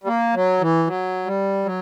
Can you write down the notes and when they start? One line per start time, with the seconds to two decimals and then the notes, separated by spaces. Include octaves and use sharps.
0.04 G3
0.07 A#3
0.35 F#3
0.61 E3
0.87 F#3
1.26 G3
1.65 F#3